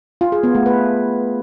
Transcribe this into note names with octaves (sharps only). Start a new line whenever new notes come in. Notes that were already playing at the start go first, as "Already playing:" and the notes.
F4
G#4
B3
A3
B4